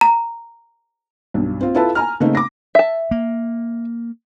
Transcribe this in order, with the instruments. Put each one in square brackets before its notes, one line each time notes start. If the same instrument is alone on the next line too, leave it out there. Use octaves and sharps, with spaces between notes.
[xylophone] A#5
[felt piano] B1 G2
C4 F4
E4 F4 A4 B4
G#5 A#5 F6
C#3 A3 A#3 C4 D#4
D6 A#6
[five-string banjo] E5 A5
[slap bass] A#3